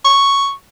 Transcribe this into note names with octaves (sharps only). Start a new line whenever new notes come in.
C#6